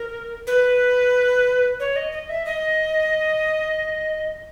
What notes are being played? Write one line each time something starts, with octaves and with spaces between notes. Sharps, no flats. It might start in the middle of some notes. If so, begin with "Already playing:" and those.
Already playing: A#4
B4
C#5
D#5
D#5
E5
D#5